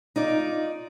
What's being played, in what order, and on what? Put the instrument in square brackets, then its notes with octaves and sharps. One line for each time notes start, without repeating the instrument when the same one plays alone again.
[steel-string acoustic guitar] D#4 F4 D5